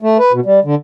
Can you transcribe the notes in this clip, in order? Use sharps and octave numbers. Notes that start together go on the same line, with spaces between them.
A3
B4
B2
G3
D3